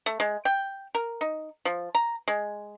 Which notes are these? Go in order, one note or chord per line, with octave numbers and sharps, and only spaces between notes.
A3
G#3
G5
A#4
D#4
F3
A#5
G#3